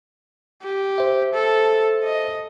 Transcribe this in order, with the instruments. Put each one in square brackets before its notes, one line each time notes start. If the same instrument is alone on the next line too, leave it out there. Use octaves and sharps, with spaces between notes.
[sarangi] G4
[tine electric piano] C5 E5
[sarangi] A4
D#5